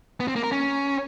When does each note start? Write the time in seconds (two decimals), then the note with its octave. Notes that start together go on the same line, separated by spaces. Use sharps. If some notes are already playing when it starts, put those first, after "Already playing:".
0.20 B3
0.28 C4
0.36 A#3
0.44 A#4
0.51 C#4